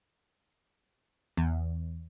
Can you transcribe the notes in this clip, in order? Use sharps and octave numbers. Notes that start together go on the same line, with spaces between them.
E2